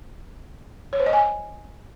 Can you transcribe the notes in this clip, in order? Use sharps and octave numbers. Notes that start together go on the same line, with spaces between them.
C#5
C5
D#5
G#5